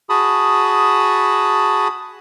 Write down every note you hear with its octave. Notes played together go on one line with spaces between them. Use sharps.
F#4 G#4 A5 B5 D#6